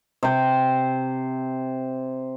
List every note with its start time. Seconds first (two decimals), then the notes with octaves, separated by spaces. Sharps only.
0.23 C3 C5